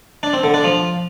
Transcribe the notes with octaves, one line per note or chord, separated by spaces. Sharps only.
D4
C4
D3
D4
F3